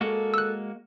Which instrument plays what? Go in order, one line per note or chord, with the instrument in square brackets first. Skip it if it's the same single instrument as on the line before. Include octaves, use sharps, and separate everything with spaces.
[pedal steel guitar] G#3 A#3 F#4 [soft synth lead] A4
[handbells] E6 F#6